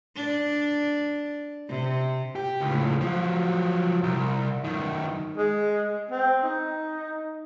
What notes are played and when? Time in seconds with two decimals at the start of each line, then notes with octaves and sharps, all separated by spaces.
0.16 D4
1.69 C3
2.36 G4
2.61 C#2 A2
3.01 F3 F#3
4.03 C2
4.64 F#2 D#3
5.37 G#3
6.11 C4
6.43 D#4